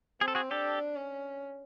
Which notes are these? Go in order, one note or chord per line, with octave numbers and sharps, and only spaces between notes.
C4 G#4
A4
F#4 G#4
D4 G4 A4
C#4